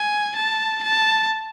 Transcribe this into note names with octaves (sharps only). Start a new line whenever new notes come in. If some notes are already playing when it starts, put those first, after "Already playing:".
Already playing: G#5
A5
A5